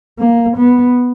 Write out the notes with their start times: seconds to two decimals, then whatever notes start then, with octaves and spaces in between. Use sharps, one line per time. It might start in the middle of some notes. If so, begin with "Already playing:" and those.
0.19 A#3
0.57 B3